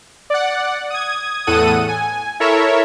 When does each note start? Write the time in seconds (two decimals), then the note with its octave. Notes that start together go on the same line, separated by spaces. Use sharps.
0.30 D5 F#5
0.90 D#6 G#6
1.47 E2 A2 A4 F#5 D#6 D#7
1.89 G#5
2.40 E4 A4 A#4 C#5 E5